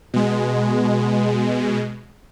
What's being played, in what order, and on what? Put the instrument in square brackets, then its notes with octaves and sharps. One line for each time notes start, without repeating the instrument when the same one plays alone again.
[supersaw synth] B2 G#3